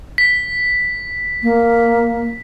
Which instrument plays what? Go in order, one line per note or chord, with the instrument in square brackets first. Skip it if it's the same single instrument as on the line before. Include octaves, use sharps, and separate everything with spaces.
[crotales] B6
[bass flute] A#3